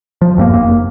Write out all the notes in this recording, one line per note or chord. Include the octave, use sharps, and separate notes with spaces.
F3
E1 G2 A3 A#3
F1 A#3